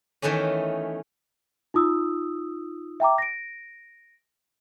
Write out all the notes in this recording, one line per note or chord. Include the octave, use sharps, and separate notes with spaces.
D#3 E3 A3 B3 C#4
D#4 F4 D#6 E6
E5 G5 A#5 D6
A#6 D7